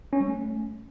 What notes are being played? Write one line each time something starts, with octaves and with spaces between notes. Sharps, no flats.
C#4
G3
A3